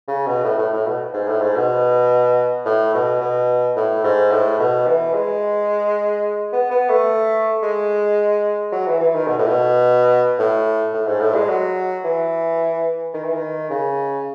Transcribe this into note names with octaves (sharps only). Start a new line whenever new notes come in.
C#3
B2
A2
A2
A2
B2
G#2
A2
G#2
B2
A2
B2
B2
A2
G#2
A2
B2
E3
G#3
B3
B3
A3
G#3
F#3
E3
E3
D#3
B2
A2
B2
A2
A2
G#2
A2
G#3
F#3
E3
D#3
E3
D#3
C#3